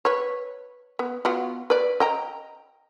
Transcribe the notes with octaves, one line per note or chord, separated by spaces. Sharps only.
B4 C#5
B3
B3 F4 F#4
B4 D5
D#5 G5 A#5